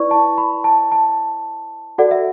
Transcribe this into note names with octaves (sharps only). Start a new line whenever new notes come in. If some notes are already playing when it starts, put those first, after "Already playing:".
Already playing: E4 B4 D5 C#6
A5
B5
A5
A5
F#4 A4 D5 F#5
E5